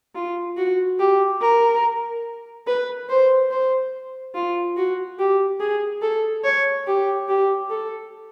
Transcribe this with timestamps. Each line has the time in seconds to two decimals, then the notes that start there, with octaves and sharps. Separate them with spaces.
0.15 F4
0.57 F#4
0.99 G4
1.41 A#4
2.67 B4
3.09 C5
3.51 C5
4.35 F4
4.77 F#4
5.19 G4
5.60 G#4
6.02 A4
6.44 C#5
6.87 G4
7.29 G4
7.70 A4